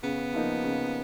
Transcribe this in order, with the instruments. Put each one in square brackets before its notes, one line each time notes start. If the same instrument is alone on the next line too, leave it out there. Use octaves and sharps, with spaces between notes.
[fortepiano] C#3 [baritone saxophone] B3
[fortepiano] F3 A#3 D#4
C#3